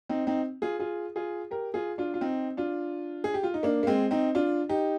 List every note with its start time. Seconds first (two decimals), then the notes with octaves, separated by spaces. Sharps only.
0.09 C4 D#4
0.27 C4 D#4
0.62 F4 G#4
0.79 F4 G#4
1.16 F4 G#4
1.51 G4 A#4
1.74 F4 G#4
1.98 D4 F4
2.14 F4
2.21 C4 D#4
2.57 D4 F4
3.24 G#4
3.34 G4
3.43 F4
3.54 D#4
3.63 A#3 D4
3.83 A#3
3.87 G#3 C4
4.11 C4 D#4
4.35 D4 F4
4.69 D#4 G4